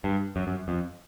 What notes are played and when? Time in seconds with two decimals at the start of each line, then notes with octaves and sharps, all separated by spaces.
0.04 G2
0.36 F#2
0.47 F#2
0.68 F2